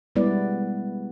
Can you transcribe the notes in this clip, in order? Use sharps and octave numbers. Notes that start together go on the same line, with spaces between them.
G3 G#3 B3 E4 B4 D5